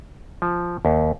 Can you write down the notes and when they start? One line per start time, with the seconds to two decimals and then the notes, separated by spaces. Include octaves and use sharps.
0.42 F3
0.85 D#2